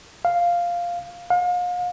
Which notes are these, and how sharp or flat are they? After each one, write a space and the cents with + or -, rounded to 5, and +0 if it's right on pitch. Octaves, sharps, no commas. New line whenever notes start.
F5 -5
F5 +35